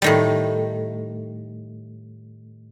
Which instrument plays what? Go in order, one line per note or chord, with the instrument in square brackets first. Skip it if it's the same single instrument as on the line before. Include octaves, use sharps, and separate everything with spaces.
[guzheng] A2 D#3 G3